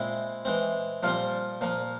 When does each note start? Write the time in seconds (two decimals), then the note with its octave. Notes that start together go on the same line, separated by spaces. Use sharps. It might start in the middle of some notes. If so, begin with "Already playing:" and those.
Already playing: A#2 G#3 C4 E4
0.45 E3 G#3 C4
1.03 A#2 F3 G3 C4 F4
1.61 A#2 F3 A#3